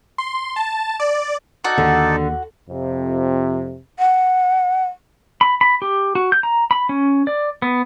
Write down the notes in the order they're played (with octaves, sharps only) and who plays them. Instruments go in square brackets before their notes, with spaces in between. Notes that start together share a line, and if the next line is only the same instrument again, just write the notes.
[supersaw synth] C6
A5
D5
[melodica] D#4 A4 D5 [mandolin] F#4
[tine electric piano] D#2 [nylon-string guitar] D3
[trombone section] F2 C3
[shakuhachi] F#5
[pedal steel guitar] B5
B5
G4
F#4
G6
A#5
B5
C#4
D5
B3